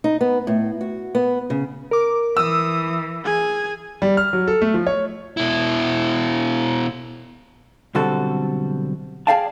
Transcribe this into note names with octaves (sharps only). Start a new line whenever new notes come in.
D#4
B3
A2
F#4
B3
C#3
A#4 D6
E3 D#6 E6
G#4 G#5
G3
F6
F#3
A4
A3
F3
C#5
B2 E4
B1 D3 G3 C4 F#4 A4
G#4 A4 D5 F5 G5 A5